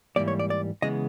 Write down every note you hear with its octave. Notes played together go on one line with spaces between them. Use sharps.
G#2 E3 G3 A#3 D5
C#5
D5
D5
C#3 E3 G#3 B3 D#5